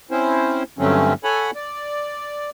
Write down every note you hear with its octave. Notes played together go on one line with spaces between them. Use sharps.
C4 C#4 E4 C5
G2 D3 F#3 A3 C4 C#4
A4 C#5 F#5 G#5 B5
D5